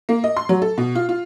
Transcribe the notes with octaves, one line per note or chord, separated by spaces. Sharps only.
A#3
D#5
C6
F#3
A4
B2
F4
F4